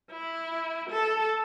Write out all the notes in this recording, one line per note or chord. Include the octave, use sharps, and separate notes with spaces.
E4
A4